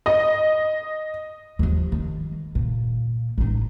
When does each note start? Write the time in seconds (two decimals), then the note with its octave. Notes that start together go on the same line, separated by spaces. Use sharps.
0.06 D#5
1.59 D#2 F3
1.92 D#3
2.55 A#2
3.38 A1 D#4